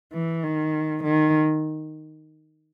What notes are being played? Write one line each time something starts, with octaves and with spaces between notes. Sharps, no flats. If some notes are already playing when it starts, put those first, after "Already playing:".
E3
D#3
D#3